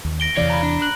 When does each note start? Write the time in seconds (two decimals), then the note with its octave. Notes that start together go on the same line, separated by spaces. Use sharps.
0.05 D#2
0.20 A#6 D7 G7
0.37 E2 C3 E3 C#5 D5 F5
0.50 A#5 B5
0.63 D4
0.82 F#6 F#7